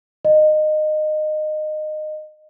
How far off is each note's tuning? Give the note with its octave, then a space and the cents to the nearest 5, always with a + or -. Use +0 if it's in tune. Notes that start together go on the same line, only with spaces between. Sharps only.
D#5 -20